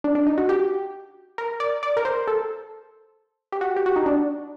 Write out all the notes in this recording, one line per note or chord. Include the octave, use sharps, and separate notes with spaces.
D4
D4
D#4
F#4
G4
A#4
D5
D5
A#4
C5
A4
G4
F#4
G4
F#4
D#4
D4